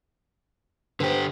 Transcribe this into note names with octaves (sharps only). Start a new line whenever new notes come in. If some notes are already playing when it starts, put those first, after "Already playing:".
D3 G4 B4 C5